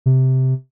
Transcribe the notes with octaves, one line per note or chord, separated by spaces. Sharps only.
C3